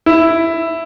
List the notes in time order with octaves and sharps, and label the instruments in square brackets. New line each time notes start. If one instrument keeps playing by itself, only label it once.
[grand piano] E4